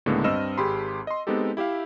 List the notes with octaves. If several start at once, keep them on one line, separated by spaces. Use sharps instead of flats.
C#2 A2 D3 G#3 A#3 B3
G2 C4 D#5 E6 F6 E7
G#1 G4 G#4 B5 C6
D#5 C6
G#3 B3 C4 D#4 G4 A4
E4 G4 E5 F5